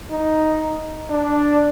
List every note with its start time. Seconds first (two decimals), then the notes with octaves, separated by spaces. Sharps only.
0.10 D#4
1.10 D4